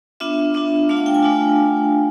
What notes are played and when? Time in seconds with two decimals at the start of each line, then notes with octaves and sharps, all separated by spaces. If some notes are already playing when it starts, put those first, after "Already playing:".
0.20 B3 D4 F4 E5
0.54 B3 D4 F4 E5
0.89 A3 D4 F4 F5
0.97 F#5
1.06 G5
1.14 G#5
1.23 A3 D4 F4